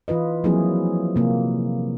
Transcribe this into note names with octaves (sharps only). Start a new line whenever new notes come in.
E3 F4 B4 D#5
F3 F#3 A#3 C4 E4 G#4
C3 A#3